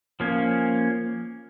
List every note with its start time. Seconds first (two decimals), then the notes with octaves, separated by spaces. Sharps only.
0.20 F3 A#3 C#4